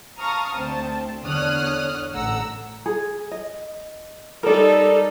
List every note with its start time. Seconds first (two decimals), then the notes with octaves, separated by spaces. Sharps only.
0.19 F5 A5 A#5 C#6 D#6 F6
0.55 D2 C4 A5
1.23 E2 D3 C#5 D#6 F6 F#6
2.14 A1 A3 F#5 A#5 E6
2.86 G#4
3.31 D#5
4.43 G3 D#4 A4 A#4 D5